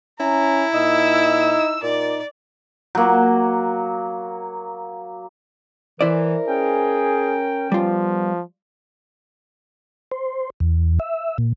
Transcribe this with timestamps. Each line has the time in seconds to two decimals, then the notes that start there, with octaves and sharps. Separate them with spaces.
0.20 C#4 E4 A#5
0.75 A#2 D#4 E6
1.83 A#2 D#4 D5
2.95 F#3 A#3
6.01 E3 E4 A#4 C5 D5
6.48 C#4 G#4 G5
7.72 F3 G3 B3 F4
10.11 C5
10.60 E2
11.00 E5
11.38 A#2